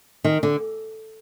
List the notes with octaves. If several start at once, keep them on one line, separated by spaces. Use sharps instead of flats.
D#3
D3